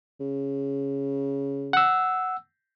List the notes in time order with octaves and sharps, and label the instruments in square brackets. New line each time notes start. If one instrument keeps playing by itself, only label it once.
[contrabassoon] C#3
[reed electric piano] F#5 E6